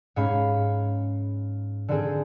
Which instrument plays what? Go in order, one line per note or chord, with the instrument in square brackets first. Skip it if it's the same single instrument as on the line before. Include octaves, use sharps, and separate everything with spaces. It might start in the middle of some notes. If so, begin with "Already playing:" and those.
[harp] G#2 C#4 C#5 F5 B5
D3 D#3 C4 G#4